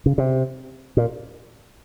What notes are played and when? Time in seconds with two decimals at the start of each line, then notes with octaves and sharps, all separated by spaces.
0.06 C#3
0.18 C3
0.97 A#2